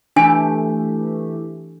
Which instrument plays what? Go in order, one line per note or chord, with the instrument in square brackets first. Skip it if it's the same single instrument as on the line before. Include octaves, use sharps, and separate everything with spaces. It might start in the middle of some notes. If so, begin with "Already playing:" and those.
[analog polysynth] E3 A3 G4 [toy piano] D4 G#5